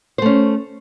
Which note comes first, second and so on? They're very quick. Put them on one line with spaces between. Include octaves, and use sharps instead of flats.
C5 A3 C#4